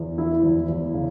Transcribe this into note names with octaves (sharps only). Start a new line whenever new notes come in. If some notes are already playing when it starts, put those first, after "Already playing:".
Already playing: E2
E3 E4
E2
E2
C#3